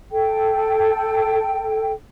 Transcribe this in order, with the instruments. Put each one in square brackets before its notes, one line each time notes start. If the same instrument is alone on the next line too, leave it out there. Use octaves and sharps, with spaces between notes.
[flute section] A4 G5